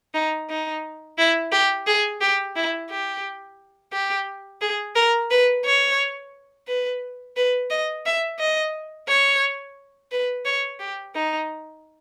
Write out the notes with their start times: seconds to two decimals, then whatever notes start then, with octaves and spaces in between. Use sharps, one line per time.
0.14 D#4
0.50 D#4
1.18 E4
1.52 G4
1.87 G#4
2.21 G4
2.56 E4
2.90 G4
3.93 G4
4.61 G#4
4.95 A#4
5.31 B4
5.65 C#5
6.68 B4
7.37 B4
7.71 D#5
8.06 E5
8.39 D#5
9.08 C#5
10.12 B4
10.45 C#5
10.80 G4
11.15 D#4